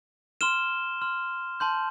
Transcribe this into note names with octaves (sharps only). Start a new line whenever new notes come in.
C6 F6 E7 G7
C6 F6
A5 C6 G6